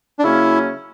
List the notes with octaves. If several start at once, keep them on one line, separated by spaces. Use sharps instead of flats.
D4
C#3 F#3 A#3 C#4 E4